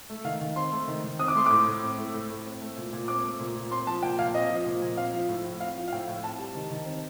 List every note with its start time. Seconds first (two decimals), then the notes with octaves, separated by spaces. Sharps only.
0.10 A3
0.24 D#3 F5
0.41 D#3
0.56 C4 C6
0.72 A3
0.88 D#3
1.04 D#3
1.19 C4 D#6
1.28 D6
1.35 A3 C6
1.46 A2 D6
1.67 A2
1.83 C4
1.98 A3
2.14 A2
2.30 A2
2.46 C4
2.61 A3
2.77 A#2
2.93 A#2
3.08 C4 D6
3.24 A3
3.39 A#2
3.55 A#2
3.71 C4 C6
3.87 F3 A5
4.02 A#2 G5
4.18 A#2 F5
4.34 C4 D#5
4.50 F3
4.66 A#2
4.81 A#2
4.97 C4 F5
5.13 F3
5.29 A2
5.45 A2
5.60 C4 F5
5.76 F3
5.88 F5
5.92 A2 G5
6.08 A2
6.23 C4 A5
6.39 G3
6.55 D#3
6.70 D#3
6.86 C4